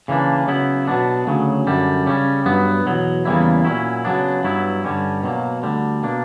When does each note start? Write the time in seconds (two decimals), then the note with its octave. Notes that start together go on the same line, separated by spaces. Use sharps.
0.08 C#3 E3 A#3 D4
0.48 C#3 F#3 B3 E4
0.88 B2 F#3 B3 D4
1.27 D2 C#3 F#3
1.67 F#2 D3 G3
2.07 C#3 G3 C#4
2.46 G2 F#3 B3
2.86 E2 B2 F#3
3.25 E2 C#3 G3 A#3 E4
3.65 A#2 F#3 C#4 E4
4.05 C#3 F#3 B3 D4
4.44 G2 F#3 B3 E4
4.84 G2 D3 G3 C#4
5.23 B2 F#3 A#3
5.63 D2 D3 G3
6.03 B2 A#3 D4